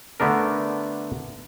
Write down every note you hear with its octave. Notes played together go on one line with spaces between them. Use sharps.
D3 A3 B3 D4 A#4